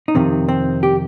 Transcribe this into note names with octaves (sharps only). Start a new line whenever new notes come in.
D#4
F2 C3 D#3 C4
C4
G4